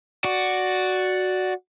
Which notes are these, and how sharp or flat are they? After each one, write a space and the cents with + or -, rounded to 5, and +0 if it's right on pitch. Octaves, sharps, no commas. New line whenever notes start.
F#4 +0 D5 +0